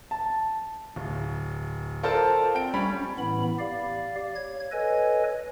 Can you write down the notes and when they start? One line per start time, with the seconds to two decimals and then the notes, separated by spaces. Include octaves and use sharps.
0.11 A5
0.96 D1
2.03 F4 A4 A#4 C5 D5 A5
2.54 C4 G5 D7
2.74 G3 C#4 B5
3.19 A2 E3 B3 B5
3.59 G4 D5 F5
4.35 C#5 G#6
4.72 A4 B4 C#5 D#5 G#5